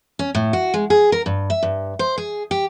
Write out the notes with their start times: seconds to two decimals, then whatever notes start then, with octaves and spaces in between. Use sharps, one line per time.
0.19 C#4
0.35 A2
0.53 F#4
0.74 G#3
0.90 G#4
1.12 A#4
1.26 G2
1.50 E5
1.63 G2
1.99 C5
2.18 G#4
2.51 G4